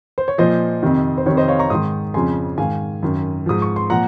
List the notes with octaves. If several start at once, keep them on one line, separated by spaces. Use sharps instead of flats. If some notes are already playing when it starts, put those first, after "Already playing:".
C5
C#5
A#2 F3 C5 D#5
F2 C3 D#3
C5
F2 C3 D#3 C#5
C5 D#5
C#5 F5
A#5 C#6
G#2 D#3 C6 D#6
F2 C#3 F3 G#5 C6
G#2 D#3 F5 G#5
F#2 D#3
G#2 F3 D#6
C#6
C6
A#2 F3 F#5 A#5